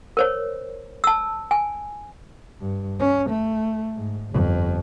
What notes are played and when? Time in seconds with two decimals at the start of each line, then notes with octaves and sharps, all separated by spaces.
0.17 A#4 C5 C#5
1.04 A5 E6
1.51 G#5
2.61 G2
3.00 C#4
3.30 A3
3.96 G#2
4.31 G1 F2